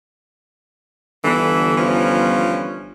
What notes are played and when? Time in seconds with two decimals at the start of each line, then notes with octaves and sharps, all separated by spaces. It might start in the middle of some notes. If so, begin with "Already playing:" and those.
1.24 G1 D3 E3
1.77 E3 F3 C#4